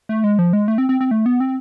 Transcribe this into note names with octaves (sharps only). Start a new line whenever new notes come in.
A3
G#3
F3
G#3
A3
C4
C4
C4
A3
B3
C4